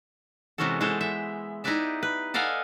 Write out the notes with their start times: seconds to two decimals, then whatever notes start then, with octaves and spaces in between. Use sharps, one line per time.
0.58 C3 E3 G#3 C#4 F#4 A4
0.80 E3 G#3 B3 A4 C5
1.00 G#3 E5
1.64 D#4 E4 G4 B4 D5 E5
2.03 B4
2.34 A4 D5 D#5 F5 F#5 G#5